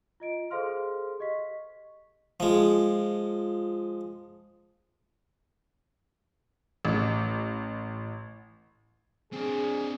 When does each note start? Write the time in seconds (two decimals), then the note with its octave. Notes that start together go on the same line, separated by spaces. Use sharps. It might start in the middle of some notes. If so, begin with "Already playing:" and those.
0.20 F4 D#5 D7
0.50 G#4 A4 C5 F5 C6 F6
1.20 G4 D#5 C#6 B6
2.40 F3 G#3
6.85 A1
9.33 C4 D4 G#4